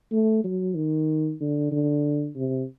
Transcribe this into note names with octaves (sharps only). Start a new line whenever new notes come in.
A3
F#3
D#3
D3
D3
C3